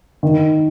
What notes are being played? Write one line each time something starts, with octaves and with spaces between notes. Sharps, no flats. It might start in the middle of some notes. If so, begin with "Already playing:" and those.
D#3